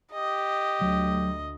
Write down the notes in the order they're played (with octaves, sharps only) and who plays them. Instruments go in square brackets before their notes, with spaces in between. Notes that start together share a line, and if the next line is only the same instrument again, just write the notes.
[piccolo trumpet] G4 [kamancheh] D#5
[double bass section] D2 [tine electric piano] F#3